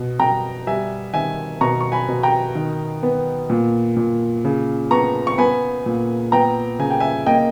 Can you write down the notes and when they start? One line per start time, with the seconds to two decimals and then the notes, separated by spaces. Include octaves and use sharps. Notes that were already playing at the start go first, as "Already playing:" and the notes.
Already playing: B2
0.19 B2 G5 A#5
0.67 G3 E5 G#5
1.14 D#3 E5 G#5
1.61 B2 A#5 C#6
1.81 C#6
1.92 G#5 B5
2.08 B2
2.23 G5 A#5
2.55 D#3
3.03 B3
3.50 A#2
3.97 A#2
4.45 C#3
4.91 B3 A#5 C#6
5.27 C#6
5.38 B3 G#5 B5
5.86 A#2
6.32 B3 G5 A#5
6.79 C#3 G#5
6.90 G5
7.00 E5 G#5
7.26 A#3 D#5 G5